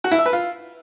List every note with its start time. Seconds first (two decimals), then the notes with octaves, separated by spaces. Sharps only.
0.04 F#4
0.11 E4
0.18 E5
0.26 B4
0.33 F4